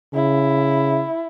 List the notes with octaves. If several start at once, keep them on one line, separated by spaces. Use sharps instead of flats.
C#3 E4